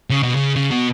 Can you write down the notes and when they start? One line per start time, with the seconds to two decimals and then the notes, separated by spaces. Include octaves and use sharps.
0.10 C#3
0.23 B2
0.35 C#3
0.56 C#3
0.72 B2